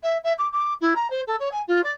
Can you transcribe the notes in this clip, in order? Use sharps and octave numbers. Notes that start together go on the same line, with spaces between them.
E5
E5
D6
D6
E4
A#5
C5
A4
C#5
G#5
F4
D5